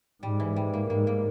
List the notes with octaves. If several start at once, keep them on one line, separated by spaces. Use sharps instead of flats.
G#2 G3
E3
G3
A#3
G#2 A#3
A#3